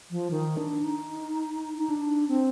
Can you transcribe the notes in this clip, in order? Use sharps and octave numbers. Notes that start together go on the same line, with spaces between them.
F3
D#3
D4
D#4
D#4
D4
C4